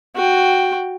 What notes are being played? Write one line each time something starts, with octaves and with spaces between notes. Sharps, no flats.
F#4 G5